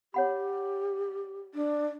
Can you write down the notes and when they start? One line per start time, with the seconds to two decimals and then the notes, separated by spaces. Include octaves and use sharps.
0.14 G4 C#5 F#5 B5
1.54 D4